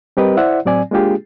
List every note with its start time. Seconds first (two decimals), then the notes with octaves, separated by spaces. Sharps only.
0.17 G3 C4 G4 A#4 B4 D#5
0.37 E4 C5 D5 E5 F#5
0.65 A2 F#3 C4 D5 G#5
0.91 G#3 A#3 D4 F4 G4 G#4